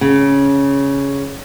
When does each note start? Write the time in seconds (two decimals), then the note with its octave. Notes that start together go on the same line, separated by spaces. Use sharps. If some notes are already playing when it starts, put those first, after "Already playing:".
0.01 C#3